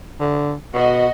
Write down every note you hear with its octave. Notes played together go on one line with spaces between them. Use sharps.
D3
B2 F#4 D#5